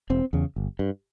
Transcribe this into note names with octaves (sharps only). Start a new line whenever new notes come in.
E1 C4
E2 C#3
G1
G2